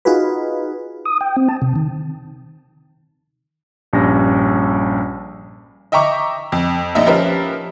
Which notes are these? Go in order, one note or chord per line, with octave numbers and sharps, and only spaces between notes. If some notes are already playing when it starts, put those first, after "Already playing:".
D#4 F4 F#4 G#4 B4
D#6
G5
C4
A5
C3
D#3
A#1 G2 G3 C#4 A#6
D#5 E5 G5 A#5 C#6 D6
F2
A#1 D#4 D#5 E5
F3 C#4 G4 A#4 B4 E5